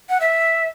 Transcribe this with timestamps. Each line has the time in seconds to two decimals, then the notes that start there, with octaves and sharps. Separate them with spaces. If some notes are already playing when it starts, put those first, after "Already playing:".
0.10 F#5
0.20 E5